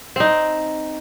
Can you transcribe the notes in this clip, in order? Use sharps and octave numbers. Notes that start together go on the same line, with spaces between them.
C4 D#4